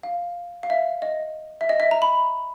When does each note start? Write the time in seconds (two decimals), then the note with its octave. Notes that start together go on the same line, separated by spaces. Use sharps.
0.03 F5
0.63 F5
0.70 E5
1.02 D#5
1.61 E5
1.69 D#5
1.80 E5
1.91 A#5
2.02 B5